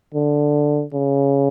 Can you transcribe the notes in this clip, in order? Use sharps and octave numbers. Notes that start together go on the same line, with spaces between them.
D3
C#3